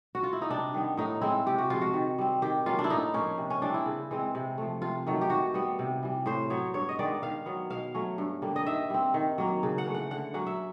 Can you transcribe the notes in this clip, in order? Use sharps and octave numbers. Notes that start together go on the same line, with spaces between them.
F#4
F4
E4
D#4
C3 D4
D#3 G3 B3
A2 D#4
E3 G#3 C4 E4
C3 G4
F#4
F3 G#3 F4
F#4
D#3
G3 C4
D#3 G4
F#3 A#3 C#4 F4
D4
E4
A2 D#4
F3 A#3 C#4
C3
C#4
E3 G3 C4 D4
E4
C#3
E3 G#3 C4
C3
F3 A3
C3 F4
D#3 F#3 A3
G4
D#3 F#4
G3 B3
C3
E3 G3
A2 C5
F#3 B3 C#5
G2 C#5
D#5
D#3 G#3 B3 D5
D#3 F5
F#3 B3
B2 F5
F#3 A3 C#4
G2
D3 G3 A#3
D#5
D#3 E5
G3 C4
D#3
F#3 A#3
C#3
F#5
E3 A3
F#5
D3 F#5
F#3 A#3 C#4 F#5
E5